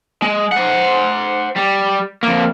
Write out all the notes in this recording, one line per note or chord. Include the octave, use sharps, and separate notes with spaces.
G#3
C5 F#5
G3
F2 A#3